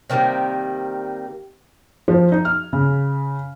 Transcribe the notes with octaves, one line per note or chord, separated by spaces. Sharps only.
C3 D#3 G3 A#3
F3
D#4
F6
C#3